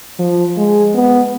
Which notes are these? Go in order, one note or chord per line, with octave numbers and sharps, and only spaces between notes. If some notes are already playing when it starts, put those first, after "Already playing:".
F3
G#3
B3